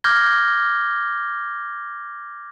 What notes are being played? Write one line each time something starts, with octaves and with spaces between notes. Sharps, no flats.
D6 F6 G6 G#6 A#6 G7